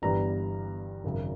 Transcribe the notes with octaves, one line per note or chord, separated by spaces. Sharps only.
G1 G2 E3 G3 B3 A#5
G#1 F#2 C#3